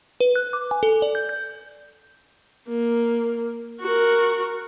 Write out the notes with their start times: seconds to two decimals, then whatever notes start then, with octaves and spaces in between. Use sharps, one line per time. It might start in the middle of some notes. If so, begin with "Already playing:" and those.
0.20 B4
0.36 F#6
0.53 D6
0.71 G#5
0.83 A4
1.02 D5
1.15 G6
1.29 G6
2.69 A#3
3.81 F#4 A#4